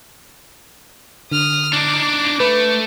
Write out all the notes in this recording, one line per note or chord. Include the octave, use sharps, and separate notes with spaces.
D3 D#6 F6
D4 D#4 D6
A3 B4